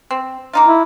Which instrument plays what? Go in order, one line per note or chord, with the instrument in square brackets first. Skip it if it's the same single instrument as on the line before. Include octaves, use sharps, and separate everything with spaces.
[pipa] C4
A#3 D#4 F4
[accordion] E4